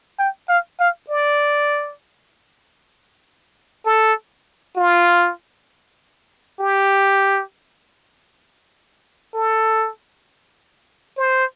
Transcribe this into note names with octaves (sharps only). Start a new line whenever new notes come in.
G5
F5
F5
D5
A4
F4
G4
A4
C5